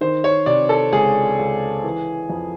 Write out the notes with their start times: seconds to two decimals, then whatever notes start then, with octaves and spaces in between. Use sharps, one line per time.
0.01 D#3 C5
0.24 C#5
0.46 C3 D5
0.69 A4
0.93 C#2 G#4
1.39 C#2
1.84 E3
2.30 F2